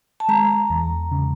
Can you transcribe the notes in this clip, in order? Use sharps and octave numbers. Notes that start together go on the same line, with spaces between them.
A5
G#3 A#5
E2
C#3